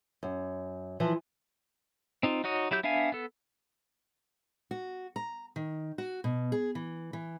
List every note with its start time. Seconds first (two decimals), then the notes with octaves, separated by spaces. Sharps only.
0.23 F#2
1.00 E3 F3
2.23 C4 D#4 F4
2.44 D#4 F#4 C#5 D#5
2.71 F#3 E4 G4 G6
2.83 B3 D4 E5 F5 G#5
3.12 B3 A4
4.71 F#4
5.16 A#5
5.56 D#3
5.98 F#4
6.24 B2
6.52 G#4
6.75 E3
7.13 E3